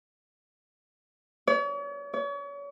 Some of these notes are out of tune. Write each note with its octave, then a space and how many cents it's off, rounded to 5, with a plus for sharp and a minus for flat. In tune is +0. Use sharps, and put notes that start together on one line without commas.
C#5 +45
C#5 +40